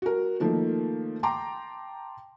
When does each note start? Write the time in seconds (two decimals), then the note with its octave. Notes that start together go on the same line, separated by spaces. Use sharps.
0.02 F#4 A#4
0.40 D#3 F3 A3 A#3
1.23 G5 A5 A#5 C6 D6